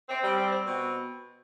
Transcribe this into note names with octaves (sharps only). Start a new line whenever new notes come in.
C4
G3
C4
C4
B2